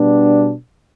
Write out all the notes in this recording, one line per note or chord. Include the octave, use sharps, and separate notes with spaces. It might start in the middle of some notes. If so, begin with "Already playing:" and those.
Already playing: B2 G3 B3 D4